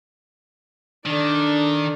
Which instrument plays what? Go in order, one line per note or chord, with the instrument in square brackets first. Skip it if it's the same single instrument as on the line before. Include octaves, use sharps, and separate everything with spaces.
[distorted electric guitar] D#3 [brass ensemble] D4 [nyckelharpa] A4 D5